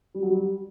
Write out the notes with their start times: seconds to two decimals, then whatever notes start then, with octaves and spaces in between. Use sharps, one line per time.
0.14 G3
0.23 F#3
0.29 G3